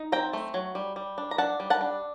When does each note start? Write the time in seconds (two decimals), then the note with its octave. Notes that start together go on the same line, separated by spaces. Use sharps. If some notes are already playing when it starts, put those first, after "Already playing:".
Already playing: D#4
0.12 C4 G5 A#5
0.33 A3
0.54 F#3
0.75 G3
0.96 G3
1.18 D4
1.31 A#5
1.38 D4 F#5 A5
1.60 G3
1.70 F#5 A5
1.81 D4